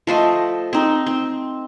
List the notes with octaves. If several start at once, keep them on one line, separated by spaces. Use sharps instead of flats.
F3 A3 C5 D#5
C4 D#4
C4